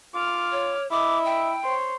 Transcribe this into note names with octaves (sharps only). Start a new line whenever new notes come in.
F4 D6 F6
C#5
E4 D#5 E5 D6
G5
C5 C#5